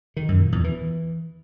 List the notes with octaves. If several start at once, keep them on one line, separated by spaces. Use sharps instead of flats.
D#3
F#2
A#2
E2
E3